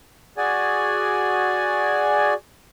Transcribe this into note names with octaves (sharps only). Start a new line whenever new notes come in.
F#4 G#4 D5 G#5